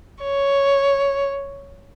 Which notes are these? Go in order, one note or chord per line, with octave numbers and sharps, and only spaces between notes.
C#5